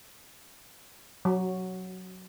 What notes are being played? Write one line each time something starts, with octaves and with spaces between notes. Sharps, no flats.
F#3